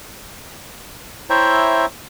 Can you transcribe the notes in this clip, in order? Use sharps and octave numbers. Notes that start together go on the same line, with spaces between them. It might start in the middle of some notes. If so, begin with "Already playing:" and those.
E4 C5 C#5 E5 G5 A#5